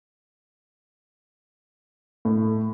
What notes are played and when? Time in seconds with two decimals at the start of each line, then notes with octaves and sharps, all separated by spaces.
2.25 A2